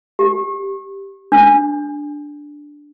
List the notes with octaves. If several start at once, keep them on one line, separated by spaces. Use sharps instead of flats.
G4
D4